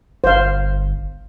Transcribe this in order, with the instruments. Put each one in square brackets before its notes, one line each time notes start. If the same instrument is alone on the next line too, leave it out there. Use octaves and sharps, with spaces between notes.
[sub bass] G1 [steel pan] C5 F5